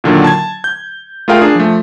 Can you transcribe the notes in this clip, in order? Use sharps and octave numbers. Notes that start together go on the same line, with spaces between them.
A#2 D3 D#3 F#3
A5 G#6
G6
A3 F4 G#4 A#4 F5 G5
D4 G#4
F3 A3